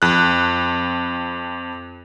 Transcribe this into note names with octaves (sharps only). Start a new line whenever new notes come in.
F2 F#6